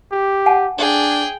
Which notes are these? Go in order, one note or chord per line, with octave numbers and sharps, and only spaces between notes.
G4
F#5 G#5 A5
D4 G#4 G5